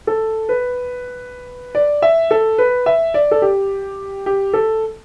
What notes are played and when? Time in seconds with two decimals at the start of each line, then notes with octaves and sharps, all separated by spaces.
0.07 A4
0.49 B4
1.75 D5
2.02 E5
2.31 A4
2.58 B4
2.86 E5
3.14 D5
3.31 A4
3.42 G4
4.26 G4
4.53 A4